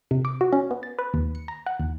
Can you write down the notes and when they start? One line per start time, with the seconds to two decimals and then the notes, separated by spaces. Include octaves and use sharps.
0.11 C3
0.25 D6
0.41 F#4
0.53 C#4
0.71 B3
0.83 A6
0.99 B4
1.14 D#2
1.35 C#7
1.48 A#5
1.66 F#5
1.80 D#2